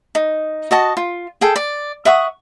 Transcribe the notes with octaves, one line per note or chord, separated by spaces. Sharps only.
D#4
F#4 D#5 A5
F4
G#4 A4 G5
D5
E5 F#5 C#6 D#6